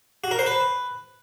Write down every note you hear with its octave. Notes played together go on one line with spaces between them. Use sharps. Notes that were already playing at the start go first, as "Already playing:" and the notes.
F#4
A#4
C5
B4